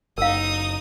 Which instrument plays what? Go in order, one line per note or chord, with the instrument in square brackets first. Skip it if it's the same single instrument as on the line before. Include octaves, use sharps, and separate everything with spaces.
[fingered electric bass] F#1 [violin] D#4 D#6 [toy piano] A#4 F5